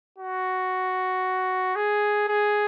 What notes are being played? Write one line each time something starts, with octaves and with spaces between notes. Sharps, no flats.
F#4
G#4
G#4